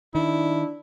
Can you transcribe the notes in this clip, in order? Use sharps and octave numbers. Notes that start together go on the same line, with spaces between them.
D#3 D4 E4